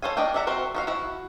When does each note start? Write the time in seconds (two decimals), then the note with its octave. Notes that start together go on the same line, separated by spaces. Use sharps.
0.02 A4 C5 C#5 F5 G#5
0.17 G3 D4 A#4 D#5 G5
0.34 D4 D5 E5 F#5 A#5
0.47 C4 F#4 A#4 C5
0.75 F3 F#4 F5
0.87 E4 F#4